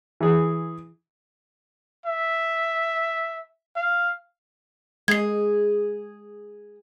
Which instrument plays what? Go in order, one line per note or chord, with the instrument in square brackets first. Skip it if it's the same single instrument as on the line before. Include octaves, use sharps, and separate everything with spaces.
[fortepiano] E3 G#4
[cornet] E5
F5
[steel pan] G#3 [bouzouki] G#4 [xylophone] G#6 C7